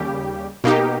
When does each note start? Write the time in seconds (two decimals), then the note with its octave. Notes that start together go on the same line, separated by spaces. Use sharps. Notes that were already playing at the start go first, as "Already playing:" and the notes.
Already playing: D#2 C#3 G3 G4
0.64 B2 A#3 D#4 G4